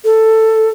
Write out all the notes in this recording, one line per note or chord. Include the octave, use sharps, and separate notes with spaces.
A4